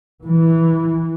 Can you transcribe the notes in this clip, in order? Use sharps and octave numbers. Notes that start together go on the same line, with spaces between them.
E3